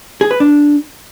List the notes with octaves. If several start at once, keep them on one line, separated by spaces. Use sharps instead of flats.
G#4
B4
D4